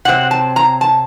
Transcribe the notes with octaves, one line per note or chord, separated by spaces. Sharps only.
C3 F#3 C4 F#5
A5
A#5
A5